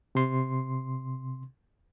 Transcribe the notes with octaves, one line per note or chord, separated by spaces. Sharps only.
C3 C6